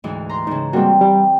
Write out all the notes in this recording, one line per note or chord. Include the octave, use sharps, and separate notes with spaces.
D2 G#2 E3
A#5 C6
G#2 C#3 D#4
G3 G#3 A#3 C4 F#4
G3 G4